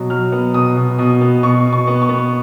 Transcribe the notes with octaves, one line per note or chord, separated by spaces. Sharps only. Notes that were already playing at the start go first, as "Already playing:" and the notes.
Already playing: B2 F#3
F#3 F6
B3
B2 D#6
B2
B2 D#6
B3
B2 C#6
B2
C#6
B3
C#6
B3